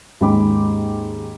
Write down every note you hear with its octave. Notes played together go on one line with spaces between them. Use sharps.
D#2 G#2 C#4 G5 B5 D6